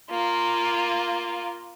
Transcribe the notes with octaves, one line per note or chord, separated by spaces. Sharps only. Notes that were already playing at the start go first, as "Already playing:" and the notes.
A#3 F4